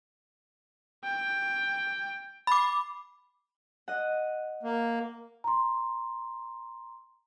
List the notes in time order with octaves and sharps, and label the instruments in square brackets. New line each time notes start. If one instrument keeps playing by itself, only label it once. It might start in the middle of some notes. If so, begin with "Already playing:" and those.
[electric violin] G5
[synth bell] B5 D6
[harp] D#5 F#5
[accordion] A#3
[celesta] A#5 C6